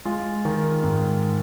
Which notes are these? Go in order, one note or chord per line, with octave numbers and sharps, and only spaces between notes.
G#3 F4
D#3
G#2